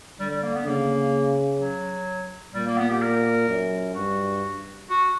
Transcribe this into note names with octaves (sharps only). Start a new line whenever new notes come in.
D3 G3
G3
A#3
B3
C#3 A#3
F#3
A#2 G3
A#3
B3
G4
A#4
F#2
G2 F#4
F#4